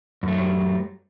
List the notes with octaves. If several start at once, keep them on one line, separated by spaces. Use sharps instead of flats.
F#2 F#3 G3 A3